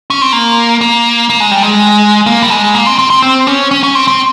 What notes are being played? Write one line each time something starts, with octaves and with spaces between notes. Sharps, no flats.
C#4
C4
A#3
A#3
A#3
G#3
G3
G#3
A#3
G3
G#3
A#3
C4
C4
C4
C4
C#4
C#4
C#4
C4
C4